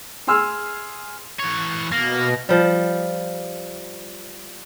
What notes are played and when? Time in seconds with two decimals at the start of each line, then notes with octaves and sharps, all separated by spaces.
0.27 G#4 G#5 C6 E6 F6
1.39 E3 C#5
1.92 B2 A#3 A#6
2.49 F3 G3